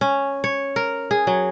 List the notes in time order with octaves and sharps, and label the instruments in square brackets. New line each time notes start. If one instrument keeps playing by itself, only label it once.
[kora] C#4
C#5
A#4
G#4
F#3